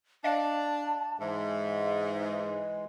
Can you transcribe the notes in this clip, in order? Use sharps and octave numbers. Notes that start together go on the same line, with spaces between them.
D4 D#5 F5 A5
G#2 E3 G#3 E5